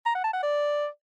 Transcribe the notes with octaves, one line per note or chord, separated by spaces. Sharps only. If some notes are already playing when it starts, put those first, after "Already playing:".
A#5
F#5
A5
F#5
D5